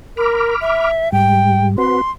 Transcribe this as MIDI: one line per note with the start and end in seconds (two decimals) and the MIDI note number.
0.17 0.54 70
0.17 0.91 83
0.17 0.91 86
0.17 0.91 89
0.61 1.12 76
1.12 1.77 44
1.12 1.77 55
1.12 1.67 79
1.78 2.01 60
1.78 2.01 66
1.78 2.01 71
1.78 2.11 84